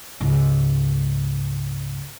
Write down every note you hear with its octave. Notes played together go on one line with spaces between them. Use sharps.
C#2 G#2